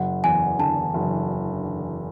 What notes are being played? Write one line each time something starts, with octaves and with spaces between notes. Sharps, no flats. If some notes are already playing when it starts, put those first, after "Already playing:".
Already playing: F#1 F#5
E2 G#5
D3 A5
F#1